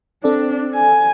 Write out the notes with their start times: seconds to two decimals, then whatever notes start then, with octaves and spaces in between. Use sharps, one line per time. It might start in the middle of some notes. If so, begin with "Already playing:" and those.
0.24 C4 D4 A4 D5
0.75 G#5